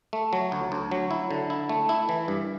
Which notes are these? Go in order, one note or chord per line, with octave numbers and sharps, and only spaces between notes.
A3
F#3
D2
D2
F#3
E4
D3
E4
A3
E4
E3
G2